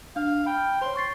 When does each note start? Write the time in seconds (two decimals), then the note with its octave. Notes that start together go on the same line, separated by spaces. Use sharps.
0.16 D4 F5
0.46 G5 B5 F6
0.81 C5 C#5 C6
0.96 C#6 A6 C7